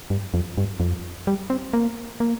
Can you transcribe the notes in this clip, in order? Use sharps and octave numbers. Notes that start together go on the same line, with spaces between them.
G2
F2
G2
F2
G3
C4
A#3
A#3